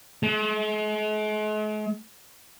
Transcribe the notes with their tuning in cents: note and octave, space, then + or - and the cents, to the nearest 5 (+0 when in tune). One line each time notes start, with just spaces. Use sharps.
G#3 +45